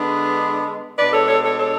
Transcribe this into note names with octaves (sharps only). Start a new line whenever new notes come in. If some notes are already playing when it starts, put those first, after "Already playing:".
Already playing: D3 G#3 B3 D4
B2 G#3 D4 B4 D5
A4 C#5
A4 C#5
A4 C#5
A4 C#5